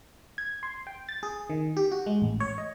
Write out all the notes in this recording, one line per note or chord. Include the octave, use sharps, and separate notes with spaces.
G#6
C6
G5
A6
G#4
D#3
G4
F#4
G#3
A1
C#5
D#5